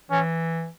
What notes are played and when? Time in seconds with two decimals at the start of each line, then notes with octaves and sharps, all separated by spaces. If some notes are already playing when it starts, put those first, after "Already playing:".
0.11 E3 C#4